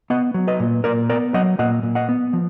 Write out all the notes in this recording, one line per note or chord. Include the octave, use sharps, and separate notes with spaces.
B3 D#5 F#5
F#3
B4 D#5
A#2
A#2 A#4 D5
B3 A#4 D5
F#3 D#5 F#5
A#2 D#5 F#5
A#2
D#5 F#5
B3
F3